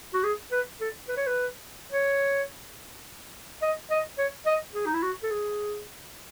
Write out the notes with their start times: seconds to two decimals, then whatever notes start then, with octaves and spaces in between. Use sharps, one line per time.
0.14 F#4
0.24 G#4
0.52 B4
0.81 A4
1.09 B4
1.17 C#5
1.27 B4
1.92 C#5
3.62 D#5
3.91 D#5
4.18 C#5
4.46 D#5
4.74 G#4
4.86 D#4
4.94 E4
5.03 F#4
5.23 A4
5.31 G#4